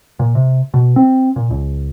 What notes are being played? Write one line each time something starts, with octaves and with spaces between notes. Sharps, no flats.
A#2
C3
B2
C4
A#2
C#2